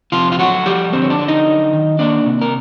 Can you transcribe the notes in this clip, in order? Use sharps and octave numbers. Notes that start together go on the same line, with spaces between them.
C3 F3 F4
F4
F#3 A3 F#4
F3 G3 G4
D3 C4 C5
C#5
D4 D5
D3
D#4 D#5
F#3
D#3
A#3 D4 D5
C3
A#4